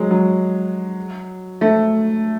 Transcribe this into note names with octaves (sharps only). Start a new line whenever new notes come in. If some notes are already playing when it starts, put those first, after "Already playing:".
Already playing: F#3 G#3
F#3
A3